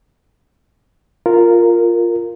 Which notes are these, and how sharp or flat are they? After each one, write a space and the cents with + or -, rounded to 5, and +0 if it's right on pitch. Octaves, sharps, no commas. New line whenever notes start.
F4 +0 A#4 -10